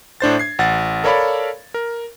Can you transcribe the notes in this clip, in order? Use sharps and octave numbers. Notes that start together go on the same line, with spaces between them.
A2 D4 C5 A6
G#6 C7
A1 F#5 A6
A4 A#4 C#5 D5 F5 B5
A#4